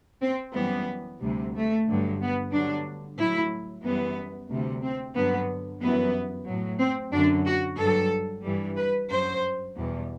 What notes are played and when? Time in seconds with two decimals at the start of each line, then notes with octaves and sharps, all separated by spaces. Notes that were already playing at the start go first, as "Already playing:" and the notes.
0.22 C4
0.55 F#2 E3 G3 B3
1.20 D2 C3 G3
1.54 A3
1.87 G2 D3 F#3
2.19 B3
2.52 G2 D3 F#3 D4
3.18 A2 F#3 E4
3.84 F#2 E3 G3 B3
4.50 D2 C3 G3
4.82 C4
5.15 G2 D3 F#3 B3
5.81 F#2 E3 G3 B3
6.47 A2 F#3
6.79 C4
7.12 F#2 D3 F#3 D4
7.46 F#4
7.78 G2 F#3 A4
8.44 G2 E3 G3
8.77 B4
9.10 F#2 F#3 C5
9.75 E2 B2 G3